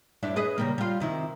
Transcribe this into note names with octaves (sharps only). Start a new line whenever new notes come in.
G2 D4 E4
G#4 B4 D#5
C#3 G3 A#3
G3 F4
C3 D#3 E4